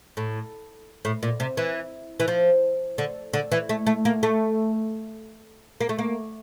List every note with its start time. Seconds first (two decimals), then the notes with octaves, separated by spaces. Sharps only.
0.17 A2
1.05 A2
1.23 A#2
1.40 C3
1.57 E3
2.20 E3
2.28 F3
2.98 D3
3.33 D3
3.52 E3
3.69 A3
3.86 A3
4.05 A#3
4.23 A3
5.81 A#3
5.89 A3
5.98 A#3